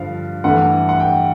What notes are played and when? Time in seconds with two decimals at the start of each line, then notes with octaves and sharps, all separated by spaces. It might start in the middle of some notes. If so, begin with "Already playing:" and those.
Already playing: G2 D3 F3 F5
0.44 G2 E3 A3 F#5
0.89 F#5
1.00 G5